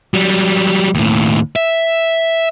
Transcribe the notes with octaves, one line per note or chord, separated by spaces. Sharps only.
F#3 G3
D#2 A2
E5